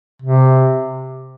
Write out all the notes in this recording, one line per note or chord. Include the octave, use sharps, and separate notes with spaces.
C3